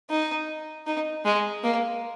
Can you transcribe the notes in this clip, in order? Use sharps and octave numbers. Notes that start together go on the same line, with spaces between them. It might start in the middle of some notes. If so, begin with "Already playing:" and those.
D#4
D#4
G#3
A#3